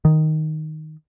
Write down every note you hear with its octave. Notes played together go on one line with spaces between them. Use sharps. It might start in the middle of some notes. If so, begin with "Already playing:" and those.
D#3